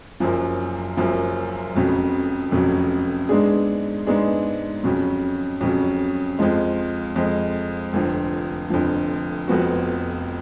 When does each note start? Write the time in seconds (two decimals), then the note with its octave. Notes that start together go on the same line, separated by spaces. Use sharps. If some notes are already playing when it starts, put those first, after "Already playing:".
0.20 F#1 F#2 F3
0.97 F#1 F#2 F3
1.75 F1 F2 C#3 F#3
2.51 F1 F2 C#3 F#3
3.29 G#2 G#3 B3 D4 G#4
4.07 G#2 G#3 B3 D4 G#4
4.83 F2 C#3 F#3
5.61 F2 C#3 F#3
6.39 F2 F3 G#3
7.16 F2 F3 G#3
7.93 F1 F2 D3 F3
8.70 F1 F2 D3 F3
9.48 F1 F2 F3 B3 F#4